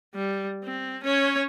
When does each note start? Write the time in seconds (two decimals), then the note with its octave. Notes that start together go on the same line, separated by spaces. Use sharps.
0.15 G3
0.64 C4
1.04 C#4 C#5